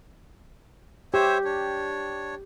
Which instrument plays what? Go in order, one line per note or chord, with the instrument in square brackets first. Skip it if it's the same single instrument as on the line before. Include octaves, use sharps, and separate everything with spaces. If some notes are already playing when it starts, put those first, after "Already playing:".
[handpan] G4 [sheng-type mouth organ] C5 C#5 E5
[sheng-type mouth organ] D4 C#5